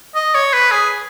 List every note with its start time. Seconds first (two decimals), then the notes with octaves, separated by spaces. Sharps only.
0.15 D#5
0.35 C#5
0.54 B4
0.72 G#4